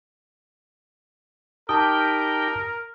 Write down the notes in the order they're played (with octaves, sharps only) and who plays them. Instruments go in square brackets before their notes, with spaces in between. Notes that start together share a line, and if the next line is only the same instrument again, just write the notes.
[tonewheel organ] D#4 G4 G5 [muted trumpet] A#4 [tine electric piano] A5 D#6